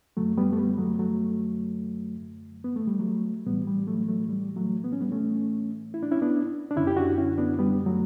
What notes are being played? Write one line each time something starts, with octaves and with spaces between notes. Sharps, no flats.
F#2 D3 F#3 A3
G3 B3
A3
G3 B3
F#3 A3
F#3 A3
B3
A3
G3
F#3 A3
A2 E3 G3 B3
G3
F#3 A3
F#3 A3
G3
F#3 A3
B3
C#4
G3 B3
A3 C#4
E4
D4
C#4 E4
B3 D4
D4
F#2 D3 C#4 E4
G4
D4 F#4
C#4 E4
B3 D4
G3 B3
F#3 A3